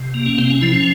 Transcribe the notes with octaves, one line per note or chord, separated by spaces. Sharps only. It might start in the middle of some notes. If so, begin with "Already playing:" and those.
Already playing: C3
A#3
C#4
C3 C4
C#4
F3 E4
C#4